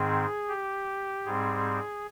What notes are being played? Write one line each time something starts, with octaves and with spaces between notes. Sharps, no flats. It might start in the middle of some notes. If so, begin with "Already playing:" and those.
Already playing: G#2 D#3 C4 G#4
G4
G#2 G3 C4 G#4